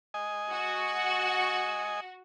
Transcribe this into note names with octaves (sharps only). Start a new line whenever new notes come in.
D#5 G#5
F#4